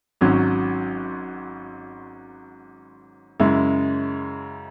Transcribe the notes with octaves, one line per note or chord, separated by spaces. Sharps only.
G#1 G#2 F#3 C#4
F#2 C#3 G#3 E4